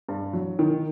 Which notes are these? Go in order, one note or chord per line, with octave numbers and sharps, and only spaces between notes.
G2
F#3
D#3